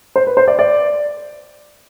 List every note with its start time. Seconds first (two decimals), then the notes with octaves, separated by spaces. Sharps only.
0.16 C5
0.27 B4
0.37 C5
0.48 D5
0.59 D5